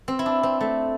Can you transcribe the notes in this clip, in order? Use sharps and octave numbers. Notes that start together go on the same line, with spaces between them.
C4
E4
D4
C4
A3